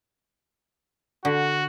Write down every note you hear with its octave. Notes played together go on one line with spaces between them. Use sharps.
D3 F#4